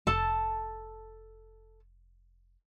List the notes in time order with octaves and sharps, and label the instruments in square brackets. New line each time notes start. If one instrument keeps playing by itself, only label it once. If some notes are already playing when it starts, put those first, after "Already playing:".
[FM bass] F1 [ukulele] A4 A5